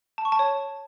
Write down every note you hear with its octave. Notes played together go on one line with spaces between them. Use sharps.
A5
C#6
A5
C#5